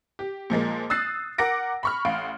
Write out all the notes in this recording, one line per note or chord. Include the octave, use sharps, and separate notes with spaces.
G4
A#2 F3 G#3 A#3
D#6 E6 F#6 A6 C7
A#4 F#5 D6 A#6 D7
B5 C#6 F6
A1 F5 D7